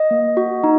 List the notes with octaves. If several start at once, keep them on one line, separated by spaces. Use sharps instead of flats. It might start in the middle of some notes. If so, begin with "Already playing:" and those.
Already playing: D#5
A#3
F#4
D#4